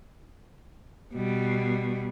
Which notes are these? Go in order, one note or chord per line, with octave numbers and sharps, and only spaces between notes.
B2 G3